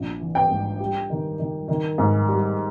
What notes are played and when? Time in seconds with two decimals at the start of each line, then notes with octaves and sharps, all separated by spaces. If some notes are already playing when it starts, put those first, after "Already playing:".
Already playing: A#1
0.20 E3
0.35 G5
0.50 G#2
0.80 G3
1.10 D#3
1.39 D#3
1.68 D#3
1.98 G#2
2.28 G3